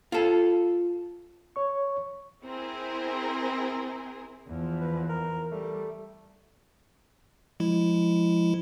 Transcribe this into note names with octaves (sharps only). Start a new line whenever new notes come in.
F4 A4
C#5 C#6
C4 E4 G#4 A#4
E2 F3
B4
A#4
G3 A3
F3 G#3 E4